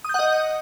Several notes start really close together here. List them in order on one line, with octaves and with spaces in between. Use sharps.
D#6 G6 F#5 D#5